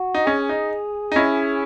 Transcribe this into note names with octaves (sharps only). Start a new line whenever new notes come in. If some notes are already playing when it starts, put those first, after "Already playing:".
Already playing: F#4
D#4
C#4 G#4
D#4
D#4
C#4 E4